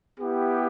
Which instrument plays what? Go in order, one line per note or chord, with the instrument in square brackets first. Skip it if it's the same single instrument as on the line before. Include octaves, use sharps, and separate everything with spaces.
[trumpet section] B3 E4 G4